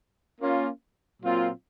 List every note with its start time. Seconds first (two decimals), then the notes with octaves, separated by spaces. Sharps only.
0.39 A#3 C#4 F4
1.21 A#2 F#3 C4 F4